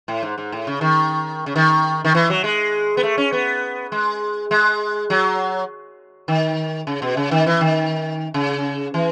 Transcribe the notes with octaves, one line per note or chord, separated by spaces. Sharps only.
A2
G#2
G#2
A2
C#3
D#3
C#3
D#3
D#3
E3
F#3
G#3
B3
A3
C#4
B3
G#3
G#3
F#3
D#3
C#3
B2
C#3
D#3
E3
D#3
C#3
E3